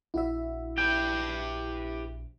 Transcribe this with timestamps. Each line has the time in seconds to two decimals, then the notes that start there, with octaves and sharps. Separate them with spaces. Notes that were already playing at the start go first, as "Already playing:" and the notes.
0.14 A#1 E4 F#4 E5
0.78 G4 B4 G5